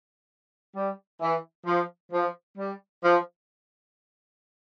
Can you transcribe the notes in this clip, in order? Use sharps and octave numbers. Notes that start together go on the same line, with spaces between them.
G3
E3
F3
F3
G3
F3